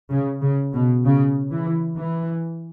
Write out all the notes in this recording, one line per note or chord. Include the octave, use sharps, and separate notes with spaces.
C#3
C#3
B2
C#3
E3
E3